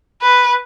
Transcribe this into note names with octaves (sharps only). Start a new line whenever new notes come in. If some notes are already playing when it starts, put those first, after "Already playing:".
B4